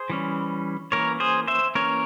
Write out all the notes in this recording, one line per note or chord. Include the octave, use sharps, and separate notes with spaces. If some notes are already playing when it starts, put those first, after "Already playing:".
Already playing: G#4 C5
E3 G3 C#4
E3 A#3 C#4 A#4 C#5
G#4 C5
C5 E5
E3 A#3 C#4 A#4 C#5